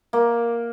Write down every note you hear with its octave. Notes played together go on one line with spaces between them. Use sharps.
A#3